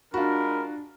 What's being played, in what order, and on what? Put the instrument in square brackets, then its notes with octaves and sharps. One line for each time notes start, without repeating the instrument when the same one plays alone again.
[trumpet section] G#3 A#4 [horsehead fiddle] D4 [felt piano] F4 F#4 [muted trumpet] B5